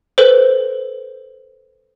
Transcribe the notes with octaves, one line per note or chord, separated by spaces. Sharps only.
A4 B4 C5